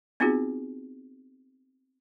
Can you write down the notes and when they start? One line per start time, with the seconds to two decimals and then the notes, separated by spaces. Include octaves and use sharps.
0.20 B3 C4 D#4 F4 F#4 G#4